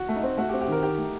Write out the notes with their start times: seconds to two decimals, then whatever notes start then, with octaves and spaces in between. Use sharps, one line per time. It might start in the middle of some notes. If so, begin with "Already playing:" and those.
Already playing: F#4
0.09 A3
0.16 D#4
0.23 C4
0.37 A3 F#4
0.49 G4
0.53 C4
0.61 G4
0.67 D#3 A#4
0.83 D#4 G4
0.98 A3